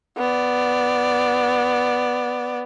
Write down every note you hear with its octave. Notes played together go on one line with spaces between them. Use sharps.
B3 D5